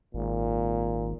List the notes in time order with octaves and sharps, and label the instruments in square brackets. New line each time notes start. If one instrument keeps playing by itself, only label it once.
[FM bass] G#1 [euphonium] A#2